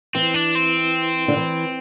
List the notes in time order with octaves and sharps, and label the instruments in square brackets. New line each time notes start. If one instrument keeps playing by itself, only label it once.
[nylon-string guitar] E3 [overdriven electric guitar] C4
[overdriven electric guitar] D4
C4
[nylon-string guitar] D3
E3